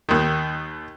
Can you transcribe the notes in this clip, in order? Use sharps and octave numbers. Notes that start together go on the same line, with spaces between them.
D#2 D#3